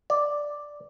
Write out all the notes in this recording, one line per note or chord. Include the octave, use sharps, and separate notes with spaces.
D5